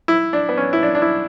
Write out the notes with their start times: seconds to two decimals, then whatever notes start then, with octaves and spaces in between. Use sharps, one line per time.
0.08 E4
0.33 D4
0.49 B3
0.57 C#4
0.73 E4
0.83 D4
0.95 D4
1.02 E4